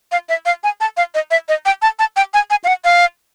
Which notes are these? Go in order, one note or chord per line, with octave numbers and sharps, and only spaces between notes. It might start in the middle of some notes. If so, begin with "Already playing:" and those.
F5
E5
F5
G#5
A5
F5
D#5
E5
D#5
G5
A5
A5
G5
G#5
G#5
F5
F#5
F5